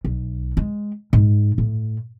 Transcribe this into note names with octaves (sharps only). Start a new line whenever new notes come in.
B1
G#3
G#2
A2